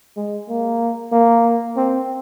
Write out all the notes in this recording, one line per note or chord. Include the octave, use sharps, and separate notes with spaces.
G#3
A#3
A#3
C4